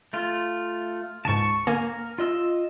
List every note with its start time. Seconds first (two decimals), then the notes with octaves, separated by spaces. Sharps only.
0.13 A3 F4
1.25 C#2 G#2 A5 C#6
1.67 D3 A#3 A#4 G#5
2.18 F4 D#5 E6